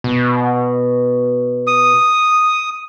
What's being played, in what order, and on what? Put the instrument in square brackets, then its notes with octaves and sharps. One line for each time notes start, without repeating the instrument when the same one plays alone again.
[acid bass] B2
[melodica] D#6